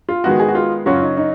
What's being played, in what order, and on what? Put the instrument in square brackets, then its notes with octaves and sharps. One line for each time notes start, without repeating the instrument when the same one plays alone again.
[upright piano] F4
[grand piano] D#3 G#3 B3 D#4 [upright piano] F#4
[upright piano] G#4
F#4
F4
[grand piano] F#2 C#3 F#3 C#4 F#4 [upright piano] F4
[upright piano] D#4
D#4